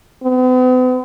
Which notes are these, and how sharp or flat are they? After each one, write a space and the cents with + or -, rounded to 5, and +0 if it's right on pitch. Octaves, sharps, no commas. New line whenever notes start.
B3 +45